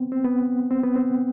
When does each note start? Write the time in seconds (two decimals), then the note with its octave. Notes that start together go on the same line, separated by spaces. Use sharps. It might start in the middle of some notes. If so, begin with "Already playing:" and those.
Already playing: B3 C4
0.12 C4
0.24 B3
0.71 C4
0.83 B3
0.96 C4